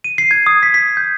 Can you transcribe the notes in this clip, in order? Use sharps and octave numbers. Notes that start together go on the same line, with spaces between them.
D#7
C7
G#6
D#6
B6
B6
G6